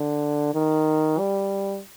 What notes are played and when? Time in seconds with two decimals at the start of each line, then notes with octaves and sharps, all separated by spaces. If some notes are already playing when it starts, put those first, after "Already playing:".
Already playing: D3
0.54 D#3
1.19 G3